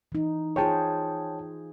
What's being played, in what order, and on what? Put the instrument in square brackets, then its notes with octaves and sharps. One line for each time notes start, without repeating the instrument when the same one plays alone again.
[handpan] E3 D#4
[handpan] F4 G#4 C5 [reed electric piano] C#5 G5 A5